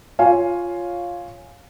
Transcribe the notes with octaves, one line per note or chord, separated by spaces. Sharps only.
F4 C#5 F5 G#5